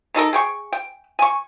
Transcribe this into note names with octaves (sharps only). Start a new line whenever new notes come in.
D#3 D#4 A4 A#4
G#4 G5 C#6
G5
G#5 C#6